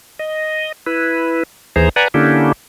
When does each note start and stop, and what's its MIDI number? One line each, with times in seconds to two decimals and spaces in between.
0.19 0.72 75
0.86 1.43 64
0.86 1.43 71
1.76 1.89 39
1.76 1.89 52
1.76 1.89 68
1.76 1.89 72
1.76 1.89 82
1.96 2.08 71
1.96 2.08 74
1.96 2.08 78
1.96 2.08 80
1.96 2.08 82
2.14 2.52 50
2.14 2.52 58
2.14 2.52 61
2.14 2.52 62
2.14 2.52 64
2.14 2.52 67